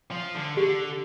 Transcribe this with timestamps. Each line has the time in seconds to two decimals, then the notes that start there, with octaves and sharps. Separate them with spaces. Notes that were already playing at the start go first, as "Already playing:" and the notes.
0.11 F3
0.35 D3
0.57 D3 G4